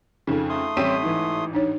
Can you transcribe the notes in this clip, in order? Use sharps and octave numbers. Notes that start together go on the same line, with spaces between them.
F2 C#3 D#4 A4
A3 C6 D#6
A1 G3 C4 C#4 B6 D#7
G#2 E3
D4 D#4 C#5